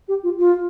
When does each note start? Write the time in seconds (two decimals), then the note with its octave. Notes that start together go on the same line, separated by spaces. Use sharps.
0.08 G4
0.23 F4
0.39 F4